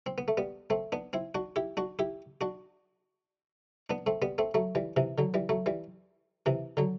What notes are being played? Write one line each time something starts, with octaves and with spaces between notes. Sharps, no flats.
C4
B3
A3
G3 B3
A3 C4
B3 D4
C4 E4
D4 F#4
E4 G4
D4 F#4
E4 G4
D4 F#4
B3 D4
A3 C4
G3 B3
A3 C4
F#3 A3
E3 G3
C3 E3
D3 F#3
E3 G3
F#3 A3
E3 G3
C3 E3
D3 F#3